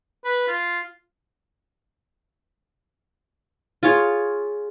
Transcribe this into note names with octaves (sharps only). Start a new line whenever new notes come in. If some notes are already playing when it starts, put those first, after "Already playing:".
B4
F4
F4 G#4 C#5